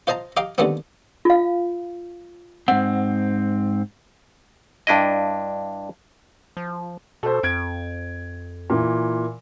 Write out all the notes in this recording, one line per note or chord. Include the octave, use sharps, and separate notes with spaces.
F4 C5 D#5 A5 A#5
G4 D#5 F5 A#5 D6
D#2 D3 G3 G#3 B3 C4
F4 F5
G#2 C4 F#5
G2 D4 E4 D#5
F3
B2 A4 C5
F2 G#6 D7
A#2 E3